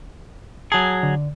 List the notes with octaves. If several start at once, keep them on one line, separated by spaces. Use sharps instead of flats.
F#3 G#4 A5
D3